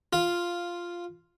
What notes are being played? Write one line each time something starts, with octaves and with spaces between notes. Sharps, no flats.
F4